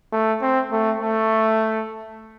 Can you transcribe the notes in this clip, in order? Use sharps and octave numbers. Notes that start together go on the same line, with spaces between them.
A3
C4
A3
A3